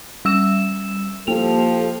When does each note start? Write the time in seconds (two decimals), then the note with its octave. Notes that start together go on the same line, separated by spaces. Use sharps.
0.25 G3 E6 E7
1.27 F3 A#3 G4 A4 F7